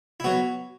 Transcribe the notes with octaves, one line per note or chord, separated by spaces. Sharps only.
E4
F#3 B3 F#4